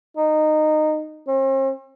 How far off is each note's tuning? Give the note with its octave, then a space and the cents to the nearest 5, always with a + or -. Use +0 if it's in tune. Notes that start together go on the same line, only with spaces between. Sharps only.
D#4 -15
C4 +45